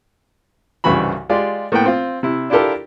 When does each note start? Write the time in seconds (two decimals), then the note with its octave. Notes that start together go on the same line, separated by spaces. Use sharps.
0.84 C2 G2 C#3 E3 F#4 B5
1.29 G#3 F4 G4 D5
1.72 A2 A#3 B3 F#5 G5
1.85 C4 F4
2.23 C3 E4
2.50 D4 E4 F4 G4 A4 A#4